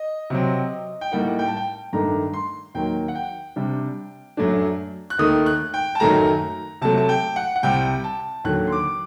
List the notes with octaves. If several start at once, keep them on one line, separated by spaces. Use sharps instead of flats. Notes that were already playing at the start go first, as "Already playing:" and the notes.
Already playing: D#5
C3 F#3 C4
G5
A2 G3 A#3 D#4 F#5
G5
A5
G5
G2 D#3 A3 D4 A#5
C6
D#2 D#3 F#3 A#3 G5
F#5
G5
C3 G3 D4
F#2 F#3 A3 D4
F#6
D#2 D#3 A3 D#6
F#6
G5
A5
F#2 D#3 F#3 A3 A#5
C3 F#3 A3 A5
A5
G5
F#5
F#5
C2 C3 G3 G5
A5
D#2 D3 F#3 F#6
C6
D6